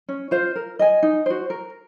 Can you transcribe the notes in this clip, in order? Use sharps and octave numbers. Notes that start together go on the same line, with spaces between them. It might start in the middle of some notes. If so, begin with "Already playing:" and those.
C#4
F4 C5 F5
A#4
D#5 G#5
D#4
F#4 C5
A#4